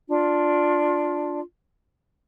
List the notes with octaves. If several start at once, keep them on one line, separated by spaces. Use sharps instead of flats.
D4 F4